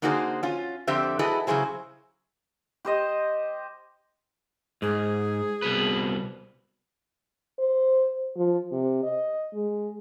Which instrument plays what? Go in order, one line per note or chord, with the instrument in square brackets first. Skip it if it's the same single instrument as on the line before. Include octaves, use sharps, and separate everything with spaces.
[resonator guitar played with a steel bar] D3 A#3 D#4 F#4 G#4 C5
C#4 F4
F2 D3 C4 G4 C5 E5
E4 F#4 G#4 A4 B4 D#5
C#3 F#3 E4 G#4 C5
[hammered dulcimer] G4 C5 D#5
[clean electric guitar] G#2 [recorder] G#4
[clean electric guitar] C2 B2 B4
[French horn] C5
F3
C3
D#5
G#3